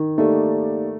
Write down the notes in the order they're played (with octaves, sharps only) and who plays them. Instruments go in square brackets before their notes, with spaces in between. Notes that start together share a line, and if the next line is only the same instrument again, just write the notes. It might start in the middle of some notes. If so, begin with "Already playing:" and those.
Already playing: [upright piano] D#3
[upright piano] A3 [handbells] A#3 D#4 G4 D5